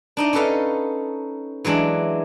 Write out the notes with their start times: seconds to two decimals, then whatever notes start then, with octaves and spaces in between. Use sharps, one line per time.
0.17 D4 D#4 D#5
0.33 C#4 D#4 A4 B4 D#5 F5
1.65 E3 F#3 G#3 D4